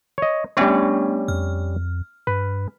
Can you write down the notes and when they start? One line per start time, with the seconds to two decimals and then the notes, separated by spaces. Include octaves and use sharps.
0.18 C#5 D#5
0.57 G3 A3 B3 C#4 D4 C#5
1.28 F2 F6
2.27 G2 B4